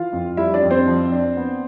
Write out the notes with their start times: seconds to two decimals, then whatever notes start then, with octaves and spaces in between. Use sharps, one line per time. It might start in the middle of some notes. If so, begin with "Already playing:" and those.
Already playing: E3 F4 F5
0.13 F2
0.37 G3 E4 E5
0.54 D4 D5
0.62 F2
0.71 C4 C5
0.87 F3
1.12 D4
1.37 B3